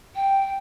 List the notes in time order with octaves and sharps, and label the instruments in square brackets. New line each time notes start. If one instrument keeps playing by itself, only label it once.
[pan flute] G5